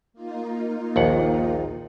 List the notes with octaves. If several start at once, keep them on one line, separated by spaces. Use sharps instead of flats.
A#3 D#4 F4
A#1 D#2 F#5